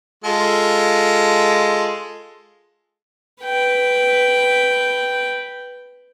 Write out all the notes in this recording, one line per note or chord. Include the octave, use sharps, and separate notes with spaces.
G#3 F4 A4
B4 G5